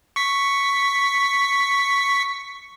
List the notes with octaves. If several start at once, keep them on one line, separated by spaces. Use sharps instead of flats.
C#6 B6